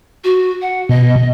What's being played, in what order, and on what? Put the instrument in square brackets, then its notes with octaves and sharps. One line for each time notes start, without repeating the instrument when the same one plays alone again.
[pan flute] F#4
F#5
[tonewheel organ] B2 [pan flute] D#5